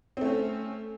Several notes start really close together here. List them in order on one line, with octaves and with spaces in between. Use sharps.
C4 A3 C#4